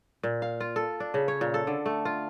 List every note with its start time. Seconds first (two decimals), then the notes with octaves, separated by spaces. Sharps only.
0.23 A#2
0.42 F5
0.61 F4
0.76 A4
1.00 D4
1.14 C#3
1.28 C#5
1.41 A#2
1.54 A4
1.67 D3
1.86 A3
2.05 F4